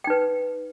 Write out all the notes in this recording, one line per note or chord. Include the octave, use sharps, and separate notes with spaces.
D#4 B4 G5